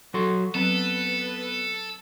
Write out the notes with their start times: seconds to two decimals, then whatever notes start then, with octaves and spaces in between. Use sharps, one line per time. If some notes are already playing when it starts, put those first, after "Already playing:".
0.14 F#3 F#4 A4 C6
0.55 F#3 B3 C4 A4 B4